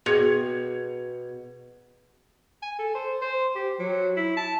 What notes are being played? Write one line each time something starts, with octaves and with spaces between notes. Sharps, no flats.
B2 F#4 G#4 G5 G#6 C#7 F7
G#5
A4
C5
C5
G4
F#3
E4
A5